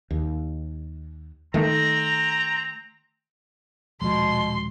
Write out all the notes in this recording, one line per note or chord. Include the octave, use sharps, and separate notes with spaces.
D#2
D#3 A3 C4 A#5
D#1 B2 F3 G#3 C6